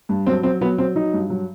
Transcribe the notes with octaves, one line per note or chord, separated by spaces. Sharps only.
G2
F#3 C4
F#3 C4
F#3 B3
F#3 C4
F#3 D#4
G2
F#3